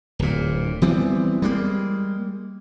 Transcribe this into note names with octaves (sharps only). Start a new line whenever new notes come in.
D1 A#2
E3 G3 B3 C4
G3 G#3 A#3